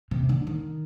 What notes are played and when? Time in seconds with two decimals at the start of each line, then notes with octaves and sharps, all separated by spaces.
0.11 C3
0.29 D3
0.47 D#3